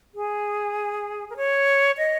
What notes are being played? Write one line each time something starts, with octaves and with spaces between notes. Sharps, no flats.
G#4
A#4
C#5
D#5